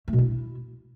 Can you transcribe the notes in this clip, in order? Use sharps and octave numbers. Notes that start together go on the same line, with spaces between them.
A3
B2
E4